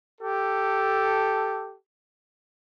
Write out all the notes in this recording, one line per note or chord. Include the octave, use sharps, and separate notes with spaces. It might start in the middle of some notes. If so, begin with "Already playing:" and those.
G4 A4